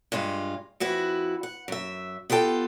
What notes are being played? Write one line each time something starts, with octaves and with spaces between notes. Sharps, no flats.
G2 G#3 F4
F2 E4 F#4 B4
F#5
F#2 E5
B3 F4 G4 A4 G5